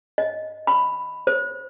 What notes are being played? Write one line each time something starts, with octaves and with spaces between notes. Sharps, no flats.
D#5
B5
C5